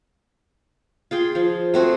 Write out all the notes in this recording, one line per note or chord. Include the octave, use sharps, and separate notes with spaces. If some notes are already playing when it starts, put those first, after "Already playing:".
F4 G#4 G5
F3
A3 C4 F#4 G#4